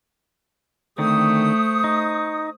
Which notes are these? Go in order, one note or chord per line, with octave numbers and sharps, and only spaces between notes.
D3 D#3 A3 C4 C5 C#6 D#6
D#4